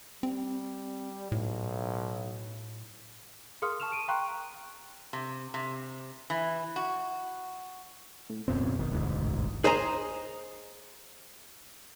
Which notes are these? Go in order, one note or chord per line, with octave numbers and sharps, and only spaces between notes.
G3 C4
B1 A2
G#4 A#4 F5 C6 D#6 F6
A5 C#6 F6 E7 F7
D7 D#7
F5 G5 A#5 C6 C#6 F#6
C3
C3
E3
F#4
A2
D1 F#2 B2 C4
G#1 D#3
E1 D2 G#2
A1
G#4 C5 D#5 G#5 A#5